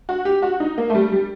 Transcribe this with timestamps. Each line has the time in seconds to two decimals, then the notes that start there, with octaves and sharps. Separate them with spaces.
0.09 F#4
0.25 G4
0.42 F#4
0.60 D#4
0.78 A#3
0.90 A3
0.95 G3
1.12 G3